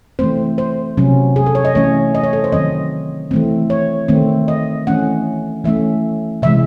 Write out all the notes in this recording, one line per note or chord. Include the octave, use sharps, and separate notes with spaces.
E3 A3 C4 C5
C5
C3 F#3 C#4
G#4
A4
C#5
D#5
E3 A3 C#4 C#5
D#5
C#5
A4
C5
D#3 F#3 C4 D#5
E3 A3 C4
C#5
D#3 A3 C4
D#5
E3 A3 C#4 F#5
E3 A3 C#4 E5
C3 E3 G#3 E5